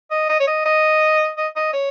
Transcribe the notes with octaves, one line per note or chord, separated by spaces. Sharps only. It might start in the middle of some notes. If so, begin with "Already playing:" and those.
D#5
D#5
C#5
D#5
D#5
D#5
D#5
C#5